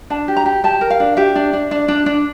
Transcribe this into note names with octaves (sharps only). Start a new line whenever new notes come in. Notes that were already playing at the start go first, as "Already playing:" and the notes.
D4 A5
G4
A#5
G4
G4 A5
A#4
F5
D4
G4 E5
D4
D4
D4
D4
D4